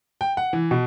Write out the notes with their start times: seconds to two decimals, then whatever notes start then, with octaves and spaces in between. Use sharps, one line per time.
0.21 G5
0.37 F#5
0.53 E3
0.71 B2